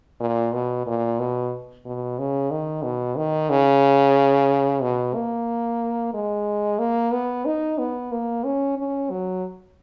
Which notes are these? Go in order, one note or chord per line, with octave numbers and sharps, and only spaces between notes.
A#2
B2
A#2
B2
B2
C#3
D#3
B2
D#3
C#3
B2
A#3
G#3
A#3
B3
D#4
B3
A#3
C#4
C#4
F#3